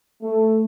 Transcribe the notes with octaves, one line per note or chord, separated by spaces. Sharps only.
A3